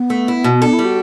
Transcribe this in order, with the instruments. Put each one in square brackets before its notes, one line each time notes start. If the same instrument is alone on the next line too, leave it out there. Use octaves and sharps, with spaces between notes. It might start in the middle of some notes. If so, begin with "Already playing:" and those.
Already playing: [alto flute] B3
[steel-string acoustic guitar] A3
E4
B2
[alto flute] D4 [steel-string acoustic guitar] A4
[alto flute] E4
[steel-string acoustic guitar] G3
[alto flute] F#4